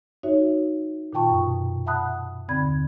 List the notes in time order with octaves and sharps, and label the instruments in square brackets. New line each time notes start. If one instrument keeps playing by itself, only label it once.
[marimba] D#4 F#4 C#5 E5
A#2 D#3 F4 G5 A5 C#6
F#2 B2
E5 F#5 A5 B5 D#6 F#6
D#2 D3 C4 D5 B5 G#6